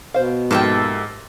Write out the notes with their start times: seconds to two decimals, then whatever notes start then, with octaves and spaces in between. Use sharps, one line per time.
0.14 B2 C5 F5
0.51 G#2 F3 A#3 G4 A4 E5 G5